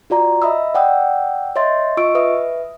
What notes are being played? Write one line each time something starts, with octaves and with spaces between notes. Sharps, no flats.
F4 F#4 D5 A#5
D#5 E5 B5 D#6 E6
D5 F#5 G5 D#6 E6
C#5 D#5 E5 C6 A6
F4 D#5 C#6 E6 D7
B4 E5 D#6